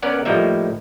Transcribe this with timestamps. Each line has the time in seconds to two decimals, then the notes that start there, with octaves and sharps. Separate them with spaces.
0.03 B3 C#4 A#4 D5 F#5
0.25 A2 F3 G3 A#3 D#4 E5